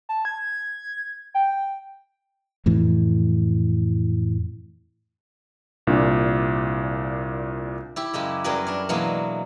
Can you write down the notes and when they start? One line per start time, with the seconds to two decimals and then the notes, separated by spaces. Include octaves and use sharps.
0.09 A5
0.25 G#6
1.35 G5
2.66 F2 A2 E3
5.87 C2 A#2 D4
7.96 E4 G4
8.13 F#2 C#3 G#3 G4
8.44 F#2 F#3 G3 G#4 A#4 B4
8.67 D4 A#4
8.89 B2 E3 F#3 G#3 A#3 B3